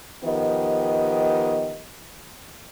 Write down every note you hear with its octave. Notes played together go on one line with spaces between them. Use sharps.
D#3 F3 B3 G4 D#5